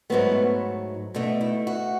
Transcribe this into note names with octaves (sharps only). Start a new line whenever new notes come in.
G#2 F#3 A3 B3
B2 A3 D4
E4
F#4